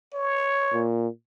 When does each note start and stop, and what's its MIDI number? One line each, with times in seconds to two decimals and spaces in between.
0.14 0.85 73
0.73 1.08 46